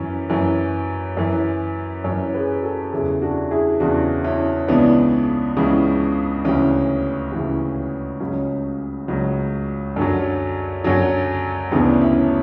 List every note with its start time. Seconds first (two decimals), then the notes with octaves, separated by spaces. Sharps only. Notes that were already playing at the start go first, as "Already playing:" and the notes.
Already playing: F#2 E3 C#4
0.30 F#2 E3
1.17 F#2 E3
2.04 F#2 C#4
2.10 E3
2.34 G#4 B4
2.63 F#4 A4
2.93 E2 C#3 E3 E4 G#4
3.22 D4 F#4
3.51 E4 G#4
3.80 E2 C#3 E3 D4 F#4
4.24 C#4 E4
4.68 C#2 C#3 E3 B3 D4
5.57 C#2 C#3 E3
6.45 D2 C#3 E3 C#4
7.32 D2 C#3 E3
8.20 C#2 C#3 F#3 C#4
9.08 C#2 C#3 F#3
9.96 F#2 D3 F#3
10.84 F#2 D3 F#3
11.71 D2 C#3 E3 B3 D4
12.01 C#4 E4